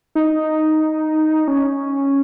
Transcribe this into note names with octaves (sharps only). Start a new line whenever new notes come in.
D#4
C#4